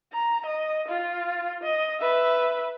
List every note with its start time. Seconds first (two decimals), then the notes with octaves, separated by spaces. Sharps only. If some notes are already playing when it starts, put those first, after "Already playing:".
0.13 A#5
0.46 D#5
0.88 F4
1.63 D#5
2.01 B4 E5